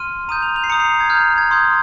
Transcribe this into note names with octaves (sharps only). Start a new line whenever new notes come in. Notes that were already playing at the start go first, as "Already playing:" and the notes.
Already playing: C6 F6 D#7
A#5 D#6 G6 D#7
F7
F7
C7
A#5 D#6 G6 C#7
C7
G#6
A#5 F6 G6
G#6
C6 D#6 G6